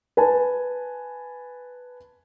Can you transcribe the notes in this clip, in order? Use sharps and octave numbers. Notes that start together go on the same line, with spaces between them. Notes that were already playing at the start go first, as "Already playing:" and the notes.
B4 G#5 A5